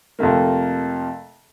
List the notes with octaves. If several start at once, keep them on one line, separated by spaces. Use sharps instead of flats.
F2 C3 A3 A#3